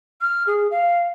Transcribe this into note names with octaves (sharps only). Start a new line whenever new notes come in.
F6
G#4
F5